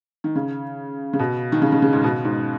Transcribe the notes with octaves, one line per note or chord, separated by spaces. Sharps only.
D#3
C#3
C#3
B2
D#3
C#3
C#3
C#3
G#2
B2
G#2